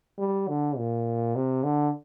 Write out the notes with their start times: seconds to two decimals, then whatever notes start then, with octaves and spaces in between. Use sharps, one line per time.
0.19 G3
0.48 D3
0.77 A#2
1.35 C3
1.64 D3